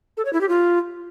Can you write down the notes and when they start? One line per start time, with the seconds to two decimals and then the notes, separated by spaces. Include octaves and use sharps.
0.17 A4
0.25 C#5
0.33 E4
0.41 G4
0.49 F4